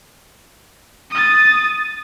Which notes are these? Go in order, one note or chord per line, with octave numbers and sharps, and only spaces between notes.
D#6 A6